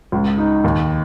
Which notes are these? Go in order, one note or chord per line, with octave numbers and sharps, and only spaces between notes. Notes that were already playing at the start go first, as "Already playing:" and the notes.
C#2
D#4
D#2